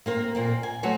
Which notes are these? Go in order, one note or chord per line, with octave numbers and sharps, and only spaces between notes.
A#3 C4 A#4
A#2 A#3 C4
G#5
F#3 A3 F#4 C5 C#5